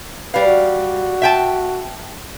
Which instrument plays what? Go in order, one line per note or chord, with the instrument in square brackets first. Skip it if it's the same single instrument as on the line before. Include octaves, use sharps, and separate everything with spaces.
[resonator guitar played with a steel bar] G3 F5 [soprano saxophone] B4
[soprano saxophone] F#4
[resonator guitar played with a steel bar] E5 G5 A5